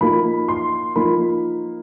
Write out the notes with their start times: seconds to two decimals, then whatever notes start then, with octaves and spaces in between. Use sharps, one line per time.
0.01 F3 A#3 D#4 B5
0.48 C6
0.96 F3 A#3 D#4 B5